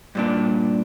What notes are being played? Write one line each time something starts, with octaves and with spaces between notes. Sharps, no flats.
G2 A#2 D4